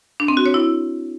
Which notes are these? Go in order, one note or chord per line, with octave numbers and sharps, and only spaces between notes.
D4
C4
F#4
C#5
E4